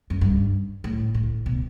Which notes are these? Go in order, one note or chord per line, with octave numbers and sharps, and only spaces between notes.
F#2
G2
A2
A2
B2